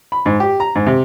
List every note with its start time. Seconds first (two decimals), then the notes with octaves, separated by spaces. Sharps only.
0.12 B5
0.26 G#2
0.40 G4
0.60 A#5
0.75 G#2
0.86 C3